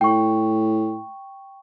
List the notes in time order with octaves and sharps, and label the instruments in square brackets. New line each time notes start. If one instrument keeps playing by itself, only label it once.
[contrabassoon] A2 [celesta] G5 C#6